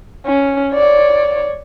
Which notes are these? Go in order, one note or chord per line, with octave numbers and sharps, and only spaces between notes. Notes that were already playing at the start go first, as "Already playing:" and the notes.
C#4
C#5 D5